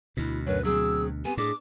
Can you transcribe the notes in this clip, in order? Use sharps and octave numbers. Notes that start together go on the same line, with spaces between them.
D2 B2 E4
F#2 B4 C#5
F#3 C4 G#4 E6
B3 C4 G4 G#5
A2 D4 G#4 D6